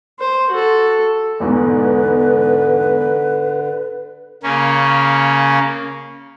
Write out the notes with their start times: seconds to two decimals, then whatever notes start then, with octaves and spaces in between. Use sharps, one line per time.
0.20 C5
0.51 F#4 A4
1.40 E2 G#2 B2 D3 B4
4.43 C#3 A#3 C#4